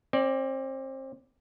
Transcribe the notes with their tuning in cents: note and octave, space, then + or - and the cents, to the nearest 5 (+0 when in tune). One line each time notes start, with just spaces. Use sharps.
C4 +30 D5 +0